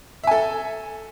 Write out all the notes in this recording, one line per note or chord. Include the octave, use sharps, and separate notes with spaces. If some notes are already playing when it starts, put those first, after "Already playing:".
A4 E5 G#5